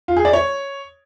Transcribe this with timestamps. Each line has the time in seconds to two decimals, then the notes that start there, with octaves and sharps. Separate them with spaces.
0.08 F4
0.17 G#4
0.25 D5
0.33 C#5